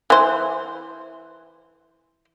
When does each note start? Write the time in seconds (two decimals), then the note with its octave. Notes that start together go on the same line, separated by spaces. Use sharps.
0.10 E3 C5